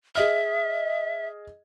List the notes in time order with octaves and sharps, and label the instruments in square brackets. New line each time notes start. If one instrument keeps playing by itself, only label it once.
[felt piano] G#4 D#5 F6 [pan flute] E5